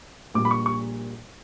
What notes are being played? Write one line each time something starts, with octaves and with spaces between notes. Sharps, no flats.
A#1 A#2 G3 D6
B5
C#6
C#6